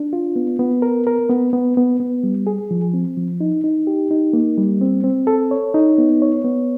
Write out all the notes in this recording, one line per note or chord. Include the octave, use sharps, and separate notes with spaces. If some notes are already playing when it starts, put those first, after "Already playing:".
Already playing: D4
F4
B3
B3
A#4
A#4
B3
B3
B3
B3
G3
G#4
F3
C4
F3
D#4
D#4
G4
D#4
A#3
G3
C4
C4
A4
C#5
D#4
B3
C#5
B3